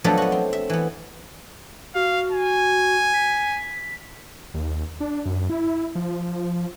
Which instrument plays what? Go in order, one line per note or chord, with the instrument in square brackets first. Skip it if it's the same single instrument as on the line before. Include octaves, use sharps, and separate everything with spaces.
[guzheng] F3 F#3 A3 B3 D4 A4
B3 F#4
C4
E5
E3 B3
[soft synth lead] F#4 [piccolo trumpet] F5
[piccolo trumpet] G#5
[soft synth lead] B6
[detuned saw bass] D#2
D4
F#2
E4
F3